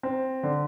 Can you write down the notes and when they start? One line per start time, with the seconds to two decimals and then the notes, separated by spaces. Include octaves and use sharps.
0.03 C4
0.43 D3